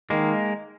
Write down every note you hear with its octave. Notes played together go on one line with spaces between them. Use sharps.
D#3 G#3 A#3